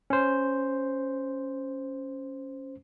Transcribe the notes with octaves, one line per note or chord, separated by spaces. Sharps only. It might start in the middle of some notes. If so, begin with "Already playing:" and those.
C#4 C5